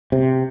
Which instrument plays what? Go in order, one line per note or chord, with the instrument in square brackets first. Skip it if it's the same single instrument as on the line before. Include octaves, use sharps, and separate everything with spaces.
[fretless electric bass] C3